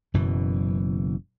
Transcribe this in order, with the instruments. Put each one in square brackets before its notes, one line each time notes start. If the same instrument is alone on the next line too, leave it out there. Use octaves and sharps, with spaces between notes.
[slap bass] F#1 F#2 B2 E3